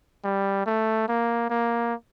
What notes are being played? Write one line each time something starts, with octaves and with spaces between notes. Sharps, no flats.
G3
A3
A#3
A#3